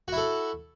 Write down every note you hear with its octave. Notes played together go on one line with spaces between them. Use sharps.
E4 F#4 A4